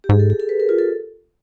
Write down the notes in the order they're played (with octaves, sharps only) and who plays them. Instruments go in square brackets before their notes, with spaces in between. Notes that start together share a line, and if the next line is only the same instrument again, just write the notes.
[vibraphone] G4
[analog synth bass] G#2 [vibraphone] G#4
[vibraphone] A4
G#4
A4
B4
A#4
F4
A4